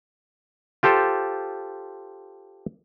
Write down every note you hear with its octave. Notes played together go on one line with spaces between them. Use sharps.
F4 G4 A4 C5